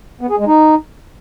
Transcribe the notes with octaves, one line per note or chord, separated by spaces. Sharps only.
B3
G#4
G#3
D#4